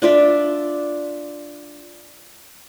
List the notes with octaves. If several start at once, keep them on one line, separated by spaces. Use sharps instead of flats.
D4 F4 D5 E5